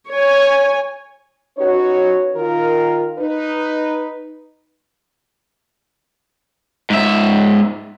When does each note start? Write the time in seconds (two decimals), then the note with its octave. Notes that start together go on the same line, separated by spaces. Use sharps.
0.12 C#5 G#5
1.58 C#4 D#4 F#4 B4 C#5
2.35 D#3 F4 A#4
3.18 D#4 B4
6.90 G#2 E5